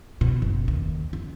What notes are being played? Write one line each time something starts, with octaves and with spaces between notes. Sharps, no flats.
B2
F#1
D#2
C#3